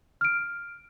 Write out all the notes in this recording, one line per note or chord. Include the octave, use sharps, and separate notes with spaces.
F6 D7